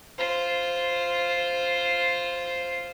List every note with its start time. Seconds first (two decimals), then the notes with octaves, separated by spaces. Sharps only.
0.18 F4 C5